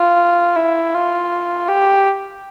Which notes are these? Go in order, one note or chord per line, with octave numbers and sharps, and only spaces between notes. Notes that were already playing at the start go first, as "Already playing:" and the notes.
Already playing: F4
E4
F4
G4